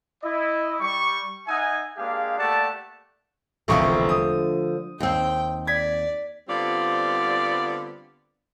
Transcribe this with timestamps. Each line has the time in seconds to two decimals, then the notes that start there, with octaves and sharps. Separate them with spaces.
0.23 E4 D#5
0.80 G3 C#6
1.47 D#4 E5 F#5 G#5
1.97 G#3 A#3 D4 G4 G#4 F5
2.39 A3 A#3 G4 D5 F#5 A5
3.68 E1 C2 D3 F3 A3 C#6
4.09 D#6
5.00 D#2 C4 G5
5.67 D5 G#6 B6
6.48 D3 G3 B3 C4 F4 D5